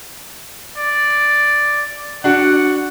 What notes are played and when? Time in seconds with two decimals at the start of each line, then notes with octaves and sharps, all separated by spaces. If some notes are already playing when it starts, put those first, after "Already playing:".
0.77 D5
2.24 D4 F#4 F#5